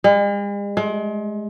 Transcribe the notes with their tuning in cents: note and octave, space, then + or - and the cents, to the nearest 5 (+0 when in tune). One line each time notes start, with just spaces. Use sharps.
G#3 -45
G#3 +35